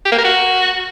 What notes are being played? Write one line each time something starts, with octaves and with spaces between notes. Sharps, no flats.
G4
A#3
A#4
F#4